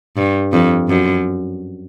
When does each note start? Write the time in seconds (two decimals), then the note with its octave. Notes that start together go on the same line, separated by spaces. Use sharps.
0.17 G2
0.53 F2
0.89 F#2